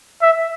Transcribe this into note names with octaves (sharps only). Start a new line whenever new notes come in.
E5